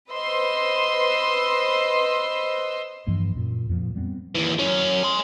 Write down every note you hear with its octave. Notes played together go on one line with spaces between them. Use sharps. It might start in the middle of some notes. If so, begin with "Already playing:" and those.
B4 C5 D#5 C6 E6
G2 E3 F3 A#3
F#2 A#2
F2 A#2 E3 F3
G3 B3 C4
D#2 E3
F#2 C#4
G#5 C6